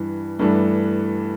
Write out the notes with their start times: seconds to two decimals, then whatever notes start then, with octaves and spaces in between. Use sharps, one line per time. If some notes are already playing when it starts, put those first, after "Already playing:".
Already playing: G2 E3
0.39 G2 E3 A3 D4